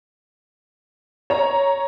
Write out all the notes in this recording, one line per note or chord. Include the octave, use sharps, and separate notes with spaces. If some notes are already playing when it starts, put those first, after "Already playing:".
C#5 A#5